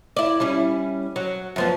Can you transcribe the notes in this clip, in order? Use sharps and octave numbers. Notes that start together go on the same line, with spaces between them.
E4 D5
G3 C#4 E4
F#3
F#2 F3 B3